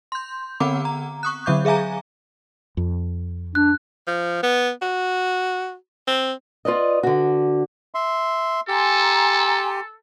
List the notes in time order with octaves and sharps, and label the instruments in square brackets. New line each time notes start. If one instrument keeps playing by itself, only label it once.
[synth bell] C6 G6
D3 B3 C4 F#5 A#5 D6
A#5
C#6 D#6 F#6
D3 F#3 E5 D6 G6
G#4 E5 F5 G#5 A#5
[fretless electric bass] F2
[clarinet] D4 [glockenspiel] F#6
[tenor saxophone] F3
B3
F#4
C4
[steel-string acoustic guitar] F4 B4 D5 D#5
D3 F#4
[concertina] E5 C6
[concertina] G4 [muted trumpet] A4 [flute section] G#5 A#5 C6